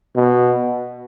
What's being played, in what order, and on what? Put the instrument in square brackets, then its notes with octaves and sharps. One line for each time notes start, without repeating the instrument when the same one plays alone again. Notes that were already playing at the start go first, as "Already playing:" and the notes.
[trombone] B2